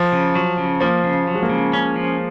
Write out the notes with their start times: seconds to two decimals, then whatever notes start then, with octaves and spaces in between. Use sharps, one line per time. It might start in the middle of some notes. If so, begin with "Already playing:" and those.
Already playing: F3
0.12 C#3
0.35 F#3
0.57 C#3
0.80 F3 A#3
1.03 C#3
1.27 F#3
1.34 G#3
1.43 A#3
1.49 C#3
1.73 C#4
1.96 F3